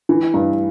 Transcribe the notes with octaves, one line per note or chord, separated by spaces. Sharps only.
E3
G2